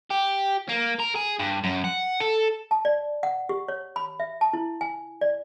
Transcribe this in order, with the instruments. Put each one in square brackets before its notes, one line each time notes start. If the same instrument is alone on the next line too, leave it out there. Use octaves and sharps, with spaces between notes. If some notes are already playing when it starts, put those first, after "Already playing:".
[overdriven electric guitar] G4
A#3
A#4
G#4
G2
F#2
F#5
A4
[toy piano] A5
D5
F#5
G4
C#5
B5
E5
A5
E4
G#5
D5